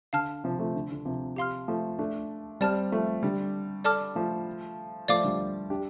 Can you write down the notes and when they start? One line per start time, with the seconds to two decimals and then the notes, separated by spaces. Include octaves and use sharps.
0.13 D3 F5 A5 F6
0.44 C3 F3
0.59 F3 A3
0.76 D3
0.91 D3
1.05 C3 F3
1.36 G4 F5 C6 F6
1.68 F3 A3
1.99 A3 D4
2.61 G3 C4 D5 A5 F6
2.92 F3 A3
3.23 D3 G3
3.85 A4 D5 A5 D6 F6
4.15 F3 A3
5.08 F3 A3 D5 F5 D6
5.24 D3 G3
5.70 D4 G4